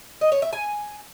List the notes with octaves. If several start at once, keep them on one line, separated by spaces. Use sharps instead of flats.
D#5
C#5
E5
G#5